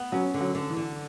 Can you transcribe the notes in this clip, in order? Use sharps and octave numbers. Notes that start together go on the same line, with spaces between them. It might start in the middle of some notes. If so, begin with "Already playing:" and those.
Already playing: B3
F#3 C#4
D3
F#3
D3
E3
D3